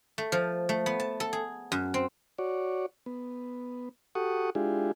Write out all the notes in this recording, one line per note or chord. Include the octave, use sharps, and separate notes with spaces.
A3
F3
A3
B3
A5
A4
G#4
F#2
C4
F#4 C#5 D5
B3
F#4 G4 A4 F#5 C#6 D#6
G#3 D4 E4 F4 G4 G#4